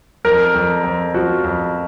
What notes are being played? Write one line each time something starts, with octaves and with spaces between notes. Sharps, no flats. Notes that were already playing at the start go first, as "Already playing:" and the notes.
F2 A#4
F2
F2
F3 F#4
F2